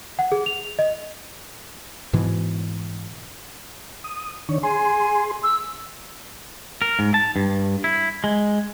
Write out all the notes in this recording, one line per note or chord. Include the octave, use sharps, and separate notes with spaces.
F#5
G#4
F7
D#5
G#2 B2 E3
D#6
D#3 D4 C#5
G#4 G#5 C6
E6
A#4
G#2
A5
G2
E4
G#3